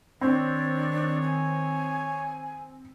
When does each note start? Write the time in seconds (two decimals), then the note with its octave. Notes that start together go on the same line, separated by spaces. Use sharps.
0.21 D#3 C4 D4 C#5
1.22 G#5